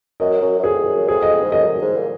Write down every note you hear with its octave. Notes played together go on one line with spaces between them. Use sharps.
F#2 D#5
F#2
F#2
F2 G#4
F#2
F2 G#4
D#5
G#2
F#2 D#5
F#2
G#2
A#2